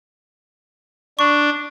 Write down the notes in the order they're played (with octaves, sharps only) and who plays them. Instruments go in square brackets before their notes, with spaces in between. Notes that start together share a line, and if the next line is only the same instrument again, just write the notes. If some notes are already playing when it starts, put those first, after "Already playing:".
[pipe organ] D4 [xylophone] C#6